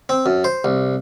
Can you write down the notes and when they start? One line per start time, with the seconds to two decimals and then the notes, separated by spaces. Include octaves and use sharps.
0.09 C4
0.26 F#2
0.44 C5
0.64 C2